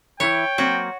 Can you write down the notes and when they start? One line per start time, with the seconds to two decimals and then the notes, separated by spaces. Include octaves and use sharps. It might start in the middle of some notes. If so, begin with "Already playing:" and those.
0.20 E3 E4 C#5 G5
0.58 F#3 A#3 C4 F#4